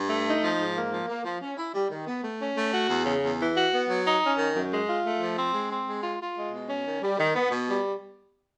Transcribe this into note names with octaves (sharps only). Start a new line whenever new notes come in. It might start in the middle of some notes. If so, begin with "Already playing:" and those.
Already playing: G2
A3
D#4
F3
G#2
A#3
F3
A#3
F3
C#4
E4
G3
D#3
B3
A3
C#4
A3
F#4
E2
C#3
E2
E3
F#4
B3
F#3
D#4
C#4
D#3
F#2
G#3
F4
A3
F3
C4
G#3
C4
G#3
F4
F4
G#3
B2
C#4
D#3
G3
D#3
B3
B2
G3